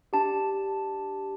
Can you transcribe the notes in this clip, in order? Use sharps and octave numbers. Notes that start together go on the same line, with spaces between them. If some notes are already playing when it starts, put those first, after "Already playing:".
D4 G4 A5